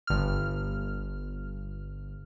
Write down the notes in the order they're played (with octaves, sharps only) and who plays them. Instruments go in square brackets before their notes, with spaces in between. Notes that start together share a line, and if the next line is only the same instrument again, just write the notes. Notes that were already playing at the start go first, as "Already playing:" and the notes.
[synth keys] G1 F6